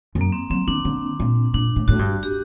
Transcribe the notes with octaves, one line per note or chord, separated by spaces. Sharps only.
F#2
A#3
C4
F#3 C4
D#3 D4
D3
A#2
A#2 D4
A2
A2 F#4
G2
G4